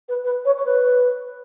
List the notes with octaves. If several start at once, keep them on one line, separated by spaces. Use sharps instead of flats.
B4
B4
C#5
C#5
B4